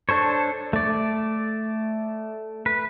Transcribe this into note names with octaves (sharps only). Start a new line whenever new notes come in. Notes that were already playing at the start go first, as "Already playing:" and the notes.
D4 A4 C5 C#5
A3 D5
B4